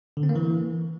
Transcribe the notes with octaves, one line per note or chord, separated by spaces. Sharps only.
D3
C4
A#3
E3